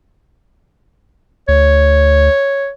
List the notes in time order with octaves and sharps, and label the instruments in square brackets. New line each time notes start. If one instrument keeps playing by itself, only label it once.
[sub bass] D2 [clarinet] C#5